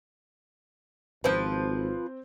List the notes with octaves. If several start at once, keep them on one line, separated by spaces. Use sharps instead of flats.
G#1 F3 C4 B4 C5 G6